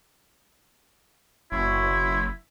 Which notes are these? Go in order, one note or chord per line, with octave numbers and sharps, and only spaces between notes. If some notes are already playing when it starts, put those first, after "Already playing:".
F#1 B2 E4 C#5 C6